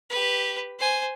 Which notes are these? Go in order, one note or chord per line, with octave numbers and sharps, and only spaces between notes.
G4 B4
C5 G#5